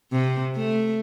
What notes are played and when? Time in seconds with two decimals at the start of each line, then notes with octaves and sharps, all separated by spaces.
0.12 C3
0.56 A3